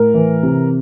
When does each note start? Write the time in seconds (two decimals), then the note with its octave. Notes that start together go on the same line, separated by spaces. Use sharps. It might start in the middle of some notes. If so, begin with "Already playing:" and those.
Already playing: A2 A#4
0.14 E3
0.43 C3